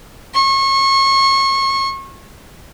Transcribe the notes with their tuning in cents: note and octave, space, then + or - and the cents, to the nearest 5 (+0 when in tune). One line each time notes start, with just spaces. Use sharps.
C#6 -30